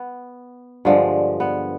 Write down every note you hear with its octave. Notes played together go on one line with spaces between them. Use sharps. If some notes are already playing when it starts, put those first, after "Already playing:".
Already playing: B3
G2 D3 F3 G#3
B3